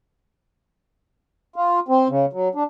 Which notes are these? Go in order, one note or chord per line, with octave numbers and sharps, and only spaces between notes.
F4
C4
C#3
F#3
D4